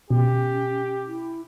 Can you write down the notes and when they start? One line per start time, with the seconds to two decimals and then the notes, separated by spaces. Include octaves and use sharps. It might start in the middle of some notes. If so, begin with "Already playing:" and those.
0.10 B2 C#4 G4
1.07 E4